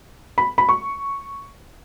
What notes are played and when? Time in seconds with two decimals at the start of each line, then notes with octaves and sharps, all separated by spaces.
0.38 B5
0.58 B5
0.69 C#6